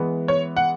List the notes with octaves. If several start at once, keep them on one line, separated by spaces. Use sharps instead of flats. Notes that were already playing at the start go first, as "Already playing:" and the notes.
Already playing: E3 G#3 B3
C#5
F#5